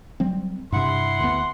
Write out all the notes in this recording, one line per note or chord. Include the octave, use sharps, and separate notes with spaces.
F#3 G3 C4
G2 C3 E4 F#5 C6
D2 B3